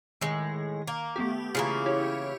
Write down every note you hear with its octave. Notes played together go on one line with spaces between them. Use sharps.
A2 D#3 G#3
A#3
A3 B3 G4
C#3 E3 A#3 F4 G#4
E4 G4 C#5